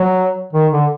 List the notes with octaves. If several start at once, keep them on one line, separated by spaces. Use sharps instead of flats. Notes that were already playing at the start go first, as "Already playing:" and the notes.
Already playing: F#3
D#3
D3